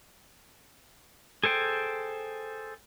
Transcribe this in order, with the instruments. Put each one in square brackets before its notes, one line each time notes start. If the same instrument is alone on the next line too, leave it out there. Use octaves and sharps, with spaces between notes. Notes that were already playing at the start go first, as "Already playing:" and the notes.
[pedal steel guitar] G#4 A4 C5 G5